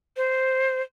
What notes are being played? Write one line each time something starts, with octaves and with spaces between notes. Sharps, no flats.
C5